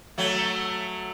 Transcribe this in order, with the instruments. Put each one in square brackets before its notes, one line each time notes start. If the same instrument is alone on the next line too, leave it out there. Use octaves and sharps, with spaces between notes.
[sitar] F#3 A3